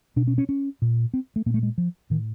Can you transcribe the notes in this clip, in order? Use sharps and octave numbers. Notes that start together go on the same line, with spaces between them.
B2 D4
C#4
C#4
C#4
A#2
C4
A3
A#2 A#3
A3
G#3
F3
A2 D#3